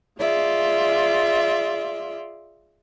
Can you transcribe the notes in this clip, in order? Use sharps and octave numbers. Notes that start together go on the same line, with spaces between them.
F4 G#4 D5 E5